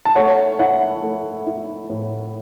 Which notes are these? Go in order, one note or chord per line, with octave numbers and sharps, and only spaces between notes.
A5
A3 C#5 F#5
E4 C#5 F#5
A3
E4
A2